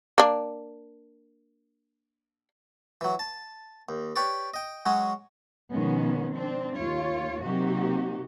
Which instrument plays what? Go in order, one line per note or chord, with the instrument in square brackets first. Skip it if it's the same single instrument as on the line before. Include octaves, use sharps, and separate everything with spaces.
[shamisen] A#3 D4
[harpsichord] E3 F#3
A5
D#2
G4 B4 C#5 D5
D#5 G5
F#3 G#3 C#4 F#4
[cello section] B2 D#3 F3 G#3 B3 C#4
C4 D4
D#2 F4 C#5
C3 F#3 A#3 D#4 F#4 G4